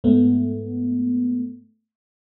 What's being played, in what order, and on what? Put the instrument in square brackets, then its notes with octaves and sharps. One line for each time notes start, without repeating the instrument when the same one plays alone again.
[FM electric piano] G#2 A3 B3